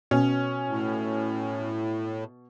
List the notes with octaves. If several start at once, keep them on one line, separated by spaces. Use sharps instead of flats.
B2 C#4
A2